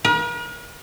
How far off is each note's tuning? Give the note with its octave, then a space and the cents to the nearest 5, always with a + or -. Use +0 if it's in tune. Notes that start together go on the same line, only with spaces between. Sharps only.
A#4 +45